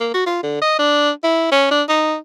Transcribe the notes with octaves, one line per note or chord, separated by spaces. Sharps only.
A#3
F#4
F4
D3
D#5
D4
E4
C#4
D4
D#4